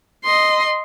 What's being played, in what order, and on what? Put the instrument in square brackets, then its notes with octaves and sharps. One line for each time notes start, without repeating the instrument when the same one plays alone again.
[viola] D#5 C6